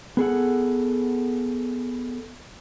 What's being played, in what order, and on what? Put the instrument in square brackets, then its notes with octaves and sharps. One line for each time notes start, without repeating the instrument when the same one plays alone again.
[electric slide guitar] B3 G#4 A4 F#5